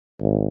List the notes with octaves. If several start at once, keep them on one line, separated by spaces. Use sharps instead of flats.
G#1